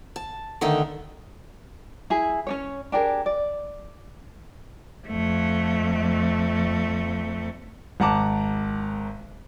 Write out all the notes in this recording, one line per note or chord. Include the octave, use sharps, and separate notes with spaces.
A5
D3 D#3 A3 D#4
E4 G#4
C#4 D4 C#5
D4 G4 G#4 A#4
D5
F2 A3
G#1 F#5 A5 A#5 D6